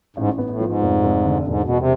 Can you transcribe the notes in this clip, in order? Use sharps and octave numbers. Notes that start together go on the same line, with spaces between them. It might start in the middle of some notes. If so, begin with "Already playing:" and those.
A1 G#2
G#2
B3
G#2
A2
G#2 F3
F1
F1
D3
E1 G#2
E1 B2
C3